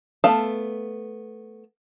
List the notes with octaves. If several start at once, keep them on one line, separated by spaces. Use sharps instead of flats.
A3 B3 F5 A5